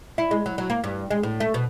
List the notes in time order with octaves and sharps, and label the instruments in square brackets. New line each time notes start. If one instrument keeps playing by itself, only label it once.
[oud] E4
G#3
F#3
F#3
A#3
G2
G#3
A2
A3
B2